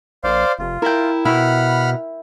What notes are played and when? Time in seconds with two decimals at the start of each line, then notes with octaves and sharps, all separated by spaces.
0.24 A#1 C5 D5 F5
0.59 F1 F4
0.82 E4 A#4 G5
1.25 B2 E4 F#5 B5 F6